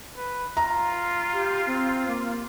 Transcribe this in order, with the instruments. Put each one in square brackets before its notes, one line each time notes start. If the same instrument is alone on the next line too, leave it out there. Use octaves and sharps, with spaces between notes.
[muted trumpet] B4
[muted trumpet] F4 [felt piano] A#5
[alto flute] G4
C4
A#3